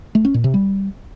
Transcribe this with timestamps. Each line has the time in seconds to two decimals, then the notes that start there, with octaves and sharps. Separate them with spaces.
0.15 A3
0.25 C#4
0.34 A#2
0.44 C3
0.54 G3